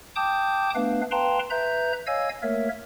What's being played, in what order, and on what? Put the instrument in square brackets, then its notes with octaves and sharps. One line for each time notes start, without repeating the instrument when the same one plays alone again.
[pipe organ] G5 A5 D6 D#6 G6
A3 B3 D4 B4 F5
B4 F5 G5 A5 A#5 C6
B4 E5 A#5 G6
C#5 D#5 F5 G#5 E6 G#6
A3 A#3 A#4 C#5 E5